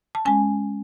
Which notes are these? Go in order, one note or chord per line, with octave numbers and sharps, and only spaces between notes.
A5
G#3 C#4 G#5